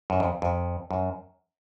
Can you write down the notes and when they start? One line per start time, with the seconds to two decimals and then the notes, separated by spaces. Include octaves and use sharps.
0.10 F#2
0.20 F2
0.42 F2
0.91 F#2